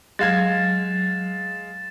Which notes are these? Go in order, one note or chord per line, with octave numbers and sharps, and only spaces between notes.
F#3 G#3 F5 G#6 A6 E7